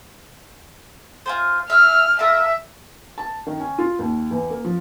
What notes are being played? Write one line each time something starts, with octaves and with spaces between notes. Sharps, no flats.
F4 G#4 C5
E5 F5 F6
F4 A4 A#4 E5
A5
D#3
C#4
F4
D#2
E2
A#3
F3